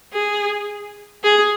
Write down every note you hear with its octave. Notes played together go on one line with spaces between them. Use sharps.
G#4
G#4